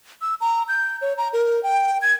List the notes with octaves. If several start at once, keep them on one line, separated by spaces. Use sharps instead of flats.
E6
A#5
G6
C#5
A#5
A#4
G5
G#6